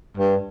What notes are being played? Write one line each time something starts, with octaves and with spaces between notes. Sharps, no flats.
G2